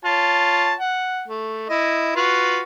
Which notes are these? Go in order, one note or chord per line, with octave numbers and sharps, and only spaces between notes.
F4 C#5 A5
F#5
A3
E4 D#5
F4 F#4 B4